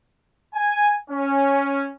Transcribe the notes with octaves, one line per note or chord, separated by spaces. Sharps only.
G#5
C#4